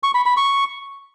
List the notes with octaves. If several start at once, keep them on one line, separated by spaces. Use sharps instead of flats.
C#6
B5
B5
C#6